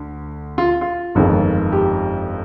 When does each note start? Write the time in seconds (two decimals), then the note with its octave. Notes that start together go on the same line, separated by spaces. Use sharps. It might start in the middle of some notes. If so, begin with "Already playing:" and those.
Already playing: D2
0.58 F4
0.81 F4
1.15 G1 F2 D#3 G#3
1.72 G4